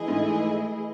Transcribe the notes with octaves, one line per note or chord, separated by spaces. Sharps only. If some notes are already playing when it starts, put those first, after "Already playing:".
Already playing: E3 A3 E4 G#4 D#5
G#2